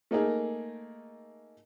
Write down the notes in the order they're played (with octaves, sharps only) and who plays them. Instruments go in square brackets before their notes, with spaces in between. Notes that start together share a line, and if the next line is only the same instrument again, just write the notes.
[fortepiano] A3 A#3 D#4 G#4 A#4